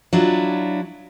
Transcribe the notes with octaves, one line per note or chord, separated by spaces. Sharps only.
F#3 D4 E4 F4